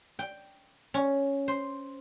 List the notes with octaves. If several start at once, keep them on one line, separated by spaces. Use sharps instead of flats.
G5
C#4
C5